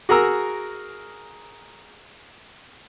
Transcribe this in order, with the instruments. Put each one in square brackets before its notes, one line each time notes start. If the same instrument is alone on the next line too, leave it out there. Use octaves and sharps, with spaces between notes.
[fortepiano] F#4 G#4 A#4 A#5 E6